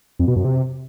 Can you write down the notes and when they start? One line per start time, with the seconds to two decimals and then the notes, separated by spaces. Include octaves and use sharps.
0.19 F2
0.28 B2
0.36 F#2
0.45 C3